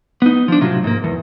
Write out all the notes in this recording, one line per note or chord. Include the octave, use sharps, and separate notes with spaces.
B3 D#4
F3 D4
A2 C3 F3 F#3
G#2 A#3
E2